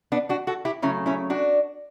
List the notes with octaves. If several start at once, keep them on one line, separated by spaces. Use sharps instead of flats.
B3 D4
D4 F#4
F#4 A4
E4 G4
C#3 F#3 A3 C#4 E4
C#4 E4
D4 F#4